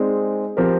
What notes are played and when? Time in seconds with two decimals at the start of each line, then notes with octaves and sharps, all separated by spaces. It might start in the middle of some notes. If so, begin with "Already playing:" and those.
Already playing: G#3 C4 D#4 G#4 D5
0.57 F3 C4 G4 A#4